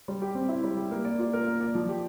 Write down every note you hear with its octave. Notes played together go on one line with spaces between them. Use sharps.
G3
G4
C4
E4
G3
G4
A#3
D5
F4
A#4
A#3
D5
F3
G4